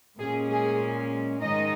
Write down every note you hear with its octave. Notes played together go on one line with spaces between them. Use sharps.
A#2 G#3 C#4 G#4
G#4
G#2 D#3 G#3 D#4 D#5